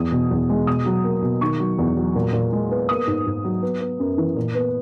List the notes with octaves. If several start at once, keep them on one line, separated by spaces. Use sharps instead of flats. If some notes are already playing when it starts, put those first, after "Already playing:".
Already playing: E2 D#6
B2
E2
G#3
B2 D#6
F#3
A#3
B2
D#3 C#6
F#3
E2
F#3
A#2
A#2
G#3
B3
A#3 D#6
G#2
G#2
F#3
B3
B3
F#2
E3
A#2
B3